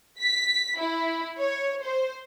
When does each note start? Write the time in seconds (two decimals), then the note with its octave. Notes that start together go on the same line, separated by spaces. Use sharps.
0.20 B6
0.77 E4
1.37 C#5
1.83 C5